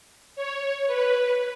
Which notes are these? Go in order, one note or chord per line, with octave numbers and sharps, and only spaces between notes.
C#5
B4